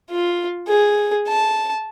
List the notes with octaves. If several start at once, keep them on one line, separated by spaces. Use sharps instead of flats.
F4
G#4
A5